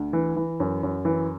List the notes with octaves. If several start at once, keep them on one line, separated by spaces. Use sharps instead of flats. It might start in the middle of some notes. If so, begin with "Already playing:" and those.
Already playing: D2
E3
E3
F#2
F#2
E3